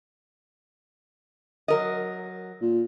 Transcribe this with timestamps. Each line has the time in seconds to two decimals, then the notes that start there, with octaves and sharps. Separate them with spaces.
1.68 F#3 A#4 D#5
2.61 A#2